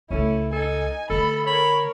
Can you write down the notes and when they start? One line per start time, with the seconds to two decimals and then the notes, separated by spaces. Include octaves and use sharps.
0.11 C#2 A3 C#4 E4 A4
0.52 D#4 A4 G#5
1.10 D3 A3 A4 B5
1.47 A#4 C#5 B5